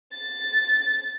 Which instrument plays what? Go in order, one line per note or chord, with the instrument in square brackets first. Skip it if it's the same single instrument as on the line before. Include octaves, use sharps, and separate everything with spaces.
[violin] A6